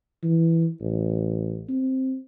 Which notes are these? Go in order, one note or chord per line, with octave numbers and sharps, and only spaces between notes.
E3
A1
C4